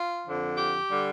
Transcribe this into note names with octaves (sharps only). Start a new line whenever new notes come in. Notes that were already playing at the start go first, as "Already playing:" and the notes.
Already playing: F4
F2 D3 F3
G4
D3 G3